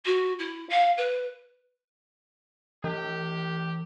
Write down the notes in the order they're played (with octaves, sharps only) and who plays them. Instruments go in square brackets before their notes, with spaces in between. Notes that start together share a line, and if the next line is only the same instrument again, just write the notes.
[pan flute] F#4
E4
F5
B4
[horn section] A2 G4 [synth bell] E3